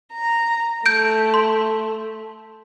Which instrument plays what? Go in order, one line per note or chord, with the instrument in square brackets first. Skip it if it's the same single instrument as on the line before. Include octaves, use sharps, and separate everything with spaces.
[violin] A#5
[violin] A3 [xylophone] G6 D7
[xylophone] C6